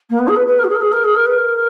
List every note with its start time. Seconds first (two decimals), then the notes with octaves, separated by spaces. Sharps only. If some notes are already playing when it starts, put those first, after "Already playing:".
0.09 A#3
0.19 B3
0.27 G#4
0.35 B4
0.46 B4
0.58 A#4
0.63 F#4
0.69 G#4
0.75 A#4
0.80 G#4
0.92 A#4
1.03 G#4
1.15 A#4
1.25 B4
1.37 A#4